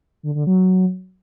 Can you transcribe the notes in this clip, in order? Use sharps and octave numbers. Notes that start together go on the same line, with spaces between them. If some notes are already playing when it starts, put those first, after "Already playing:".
D3
D3
F#3